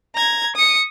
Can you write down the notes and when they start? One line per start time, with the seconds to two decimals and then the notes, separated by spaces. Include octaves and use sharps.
0.15 A#5 G#6
0.56 D#6 C#7